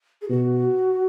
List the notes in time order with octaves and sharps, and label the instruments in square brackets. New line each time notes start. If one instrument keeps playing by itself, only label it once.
[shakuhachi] G#4
[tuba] B2 [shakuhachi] F#4